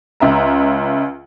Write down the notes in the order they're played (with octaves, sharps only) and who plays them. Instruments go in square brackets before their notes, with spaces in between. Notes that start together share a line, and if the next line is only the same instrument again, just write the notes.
[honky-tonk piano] C#2 E5 A#5